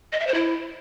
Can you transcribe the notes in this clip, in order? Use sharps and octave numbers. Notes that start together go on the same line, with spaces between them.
D#5
E5
C5
E4